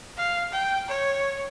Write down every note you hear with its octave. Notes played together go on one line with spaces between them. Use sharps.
F5
G5
C#5